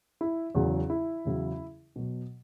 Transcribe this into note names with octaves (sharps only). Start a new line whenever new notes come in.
E4
E2 C#3 F#3
E4
E2 C#3 F#3
B2 F#3